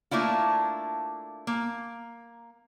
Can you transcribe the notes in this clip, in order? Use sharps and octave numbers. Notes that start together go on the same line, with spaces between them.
A3 A#3 D4 E4 F4
A#3